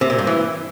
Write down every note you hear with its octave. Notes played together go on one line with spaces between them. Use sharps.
C3
A#2
G2
E3